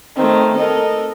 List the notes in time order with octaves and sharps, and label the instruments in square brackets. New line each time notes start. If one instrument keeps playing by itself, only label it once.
[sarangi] D#3 [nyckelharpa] A3 C4
[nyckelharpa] A4 A#4 [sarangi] D#5